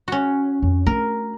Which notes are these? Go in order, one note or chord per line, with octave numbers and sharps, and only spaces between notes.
C#4 F#4
F2
A3 D4 A#4